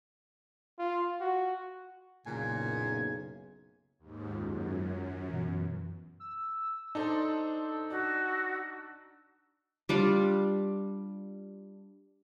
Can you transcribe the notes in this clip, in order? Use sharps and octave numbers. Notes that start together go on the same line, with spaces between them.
F4
F#4
F#1 B1 A#2 C#3 G#5
D#2 G#2
F#2 F4
B2 E3
E6
D4 D#4 A4 C5
D4 F#4
G3 D4 F4